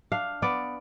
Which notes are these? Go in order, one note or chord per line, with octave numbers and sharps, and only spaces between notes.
D4 F5
B3 D5